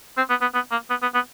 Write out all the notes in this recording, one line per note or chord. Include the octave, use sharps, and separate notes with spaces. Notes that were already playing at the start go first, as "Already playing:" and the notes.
C4
B3
B3
B3
A#3
B3
B3
B3